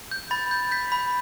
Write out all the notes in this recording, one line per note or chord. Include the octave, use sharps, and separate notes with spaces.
G6
B5 A6
G6
G6 B6
B5